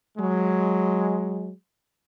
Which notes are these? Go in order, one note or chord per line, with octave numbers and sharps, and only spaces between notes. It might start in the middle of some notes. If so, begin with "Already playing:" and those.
F#3 G#3